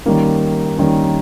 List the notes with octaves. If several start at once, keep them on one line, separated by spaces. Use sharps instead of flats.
D#3 G3 A#3 C#4
D#3 G3 A#3 C#4